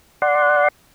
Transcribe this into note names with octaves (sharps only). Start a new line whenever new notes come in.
D5 F#5 C6